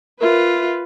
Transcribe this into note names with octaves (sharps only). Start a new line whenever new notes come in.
F4 A#4 B4 E5